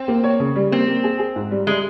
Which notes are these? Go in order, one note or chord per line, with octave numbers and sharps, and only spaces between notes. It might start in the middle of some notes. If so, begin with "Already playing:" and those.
Already playing: C4
A#3
C#5
C#3
G3
A#3 C4
A#3
G#4
G#4
G#2
G3
G3 G#3